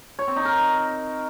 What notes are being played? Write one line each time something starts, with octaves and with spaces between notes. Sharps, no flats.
C#5
C4
D#4
A#4